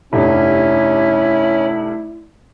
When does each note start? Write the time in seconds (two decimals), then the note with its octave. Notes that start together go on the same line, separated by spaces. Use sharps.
0.13 F1 G2 C#4 E4